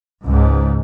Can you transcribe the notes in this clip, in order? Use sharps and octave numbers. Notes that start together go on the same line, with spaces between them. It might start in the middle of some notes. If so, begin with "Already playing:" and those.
C#2 G#2